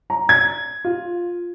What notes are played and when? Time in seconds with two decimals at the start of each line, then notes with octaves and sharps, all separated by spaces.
0.10 A#5
0.29 G#6
0.84 F4